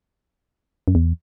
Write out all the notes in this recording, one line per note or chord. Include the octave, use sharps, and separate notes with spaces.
F#2
E2